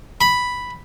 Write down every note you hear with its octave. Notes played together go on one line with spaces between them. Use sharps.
B5